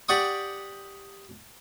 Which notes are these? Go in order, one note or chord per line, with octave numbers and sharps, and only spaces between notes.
G4 D5 F#5 C#6 D#6